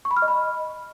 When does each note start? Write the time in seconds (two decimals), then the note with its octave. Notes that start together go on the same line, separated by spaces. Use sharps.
0.05 C#6
0.11 B5
0.17 F6
0.22 D#5
0.28 B5